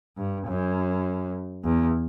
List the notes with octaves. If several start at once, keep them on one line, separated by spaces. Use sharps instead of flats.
G2
F#2
E2